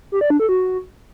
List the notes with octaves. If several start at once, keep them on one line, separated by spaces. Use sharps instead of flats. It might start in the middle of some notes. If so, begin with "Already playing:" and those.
G4
D5
D4
A4
F#4